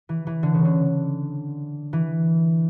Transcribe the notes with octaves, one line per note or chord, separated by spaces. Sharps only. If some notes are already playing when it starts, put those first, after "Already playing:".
E3
E3
D3
C#3
D3
E3